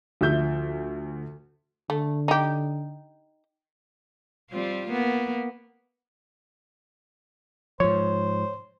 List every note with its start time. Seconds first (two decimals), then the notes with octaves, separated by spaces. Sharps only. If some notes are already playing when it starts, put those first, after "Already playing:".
0.21 D2 F3 E5 G6
1.90 D3 A3
2.28 D#4 G4
4.51 G3 C4 F4
4.88 A#3 B3
7.80 G#2 F3 C5 C#5